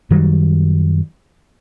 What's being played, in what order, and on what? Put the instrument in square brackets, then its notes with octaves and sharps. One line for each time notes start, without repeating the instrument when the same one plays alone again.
[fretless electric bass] F#2 D#3 F#3 G3